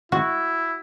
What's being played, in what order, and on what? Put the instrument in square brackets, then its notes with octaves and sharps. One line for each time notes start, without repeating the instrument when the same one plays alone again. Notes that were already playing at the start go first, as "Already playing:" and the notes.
[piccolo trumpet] E4 [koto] F#4